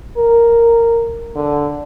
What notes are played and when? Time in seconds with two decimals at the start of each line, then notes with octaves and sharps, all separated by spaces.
0.17 A#4
1.36 D3